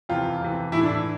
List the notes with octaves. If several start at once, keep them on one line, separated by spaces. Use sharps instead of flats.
F2 C3 E3 F4
F2 C3 E3
A2 E3 E4
D4